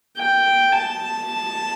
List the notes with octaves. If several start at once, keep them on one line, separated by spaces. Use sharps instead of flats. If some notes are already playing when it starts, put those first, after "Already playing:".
G5
A5